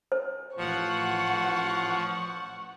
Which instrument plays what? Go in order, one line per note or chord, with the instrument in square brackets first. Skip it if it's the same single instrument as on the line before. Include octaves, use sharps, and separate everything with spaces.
[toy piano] C5
[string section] A1 F#5 [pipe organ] F3 [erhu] C#6